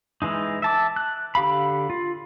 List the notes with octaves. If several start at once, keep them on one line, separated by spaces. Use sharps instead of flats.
E3 G#3 D#4
E5 A5 D6
F#6
D3 G4 F5 B5
F4